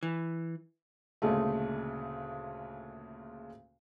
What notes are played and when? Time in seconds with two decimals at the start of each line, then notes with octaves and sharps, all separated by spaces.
0.03 E3
1.22 D2 A#2 C#3 G#3 A3